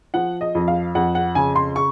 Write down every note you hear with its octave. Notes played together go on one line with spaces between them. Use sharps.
F3 F#5
D#5
F2
F5
F2 F#5
F#5
C#3 G#5
C6
C#6